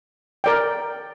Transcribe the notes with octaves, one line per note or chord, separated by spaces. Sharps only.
A#4 D5 G5